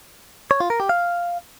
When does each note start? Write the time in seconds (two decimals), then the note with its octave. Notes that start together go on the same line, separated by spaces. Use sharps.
0.51 C#5
0.60 F4
0.70 A#4
0.80 G4
0.89 F5